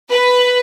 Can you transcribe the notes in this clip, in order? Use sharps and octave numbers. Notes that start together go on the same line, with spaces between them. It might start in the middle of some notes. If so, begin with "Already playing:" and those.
B4